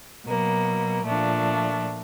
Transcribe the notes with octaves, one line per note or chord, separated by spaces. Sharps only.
B2 F#3 A#3
A#2 F3 A3 D4